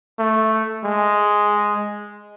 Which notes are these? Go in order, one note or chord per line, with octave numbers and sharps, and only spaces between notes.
A3
G#3